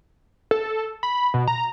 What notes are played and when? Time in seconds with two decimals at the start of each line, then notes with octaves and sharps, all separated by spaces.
0.51 A4
1.03 B5
1.34 B2
1.48 A#5